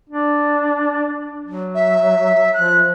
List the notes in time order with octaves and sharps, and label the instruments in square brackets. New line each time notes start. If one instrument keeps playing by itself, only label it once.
[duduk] D4
F#3
[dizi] E5
[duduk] F3 [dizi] F#6